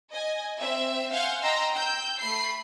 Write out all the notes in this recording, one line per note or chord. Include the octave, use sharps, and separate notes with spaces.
D#5 G#5
C4 E5 E6
F5 F#5 G#5 C6 F6 G6
D#5 G5 A#5 C6 E6
G5 E6 G6
A3 B5 C7